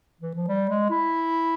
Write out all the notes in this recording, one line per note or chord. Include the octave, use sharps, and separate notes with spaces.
E3
F3
G3
G#3
E4